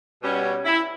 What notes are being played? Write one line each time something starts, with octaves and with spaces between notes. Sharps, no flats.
B2 G3 C#4
E4